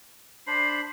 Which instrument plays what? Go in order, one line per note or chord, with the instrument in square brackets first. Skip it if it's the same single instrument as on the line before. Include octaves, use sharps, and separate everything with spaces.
[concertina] D4 C5 B5 [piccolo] C7